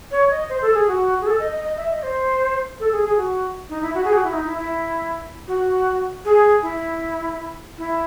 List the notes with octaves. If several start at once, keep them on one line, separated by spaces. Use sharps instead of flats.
C#5
D#5
C5
A4
G#4
F#4
G#4
A4
D#5
D#5
D#5
E5
D#5
C5
A4
G#4
G#4
F#4
D#4
E4
F#4
G#4
F#4
E4
D#4
E4
E4
F#4
G#4
E4
E4